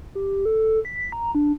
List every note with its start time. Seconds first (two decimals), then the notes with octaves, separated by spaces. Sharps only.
0.15 G4
0.45 A4
0.85 B6
1.12 A#5
1.35 D4